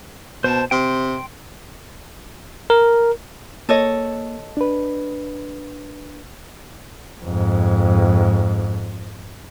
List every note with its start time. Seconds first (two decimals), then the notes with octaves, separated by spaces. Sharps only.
0.44 B2 C5 A5
0.71 C3 G5 C6
2.70 A#4
3.69 A#3 A4 C#5 D#5
4.57 D4 B4
7.24 F2 G#2